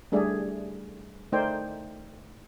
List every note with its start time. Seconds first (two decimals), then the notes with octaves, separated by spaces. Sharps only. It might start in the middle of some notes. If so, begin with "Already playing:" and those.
0.12 G3 A3 D4 G#4 D5 E5
1.32 A3 D#4 A#4 C5 D5 G5